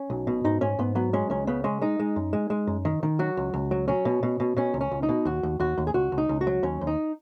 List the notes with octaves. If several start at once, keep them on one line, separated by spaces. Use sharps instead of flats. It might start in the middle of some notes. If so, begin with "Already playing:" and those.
Already playing: C#4
B1
B2
G#2 D#4
G#2 C#4
G#2 B3
F#3 B3
G#3 C#4
C#2 C#4
C#3 B3
G#3 C#4
G#3 D#4
G#3
F#2
G#3
G#3
F#2
D#3
D#3
F#3 F#4
C#2
C#2
F#3
F#3 C#4
B2
B2
B2
B2 C#4
C#2
C#4
C#2
D#4
B2
D#2 F#4
D#2
D#2 F#4
D#2
G#4
C#2 F#4
C#2
D#4
C#2
F#4
F#3
D#2 C#4
D#2
D#4